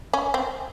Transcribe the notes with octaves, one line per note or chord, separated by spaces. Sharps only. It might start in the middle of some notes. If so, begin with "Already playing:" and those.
C#4
C4